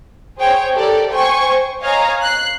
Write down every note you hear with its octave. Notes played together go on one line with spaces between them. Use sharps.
G#4 C5 C#5 G5
G4 A4 A#4 D5
C5 G5 G#5 C#6
C5
C#5 D#5 F5 G#5 A#5
F#6 C7